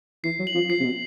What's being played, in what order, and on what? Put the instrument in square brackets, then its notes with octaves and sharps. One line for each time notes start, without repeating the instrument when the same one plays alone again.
[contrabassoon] E3 [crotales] C7
[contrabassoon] F#3
[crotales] F#7
[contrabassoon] F3
[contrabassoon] F3 [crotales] C7
[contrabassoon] C3
B2